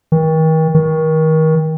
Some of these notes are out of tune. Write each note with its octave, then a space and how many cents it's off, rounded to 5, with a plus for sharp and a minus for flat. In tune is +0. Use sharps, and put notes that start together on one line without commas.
D#3 +40
D#3 +30